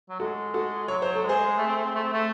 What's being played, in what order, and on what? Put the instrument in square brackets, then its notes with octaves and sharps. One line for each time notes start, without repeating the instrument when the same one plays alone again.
[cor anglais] F#3
[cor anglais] G#3 [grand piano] F#4 A4
[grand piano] F#4 A4
[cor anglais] F#3 [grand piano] C#5
[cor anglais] F#3 [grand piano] C5
[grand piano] A4
[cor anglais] G#3
[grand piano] G#4 C5
[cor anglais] A3
C4
A3
C4
A3
C4
A3